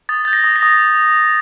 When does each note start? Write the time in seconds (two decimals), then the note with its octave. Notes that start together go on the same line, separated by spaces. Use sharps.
0.09 D#6 A6
0.25 G6 A6
0.33 A#6
0.44 D#6
0.56 A#6
0.63 D#6